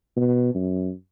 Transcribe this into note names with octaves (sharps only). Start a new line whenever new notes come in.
B2
F#2